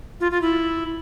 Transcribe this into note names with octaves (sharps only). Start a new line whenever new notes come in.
F4
F4
E4